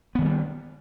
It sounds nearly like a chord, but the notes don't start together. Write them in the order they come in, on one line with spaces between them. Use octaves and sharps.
B3 D#3 G#3 G3